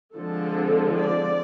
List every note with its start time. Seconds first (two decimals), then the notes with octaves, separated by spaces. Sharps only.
0.16 D3 F3 G#3 C4 A4
1.00 D5